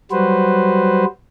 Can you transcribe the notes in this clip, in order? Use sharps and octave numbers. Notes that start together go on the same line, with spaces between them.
F#3 G3 F#4 B4 C5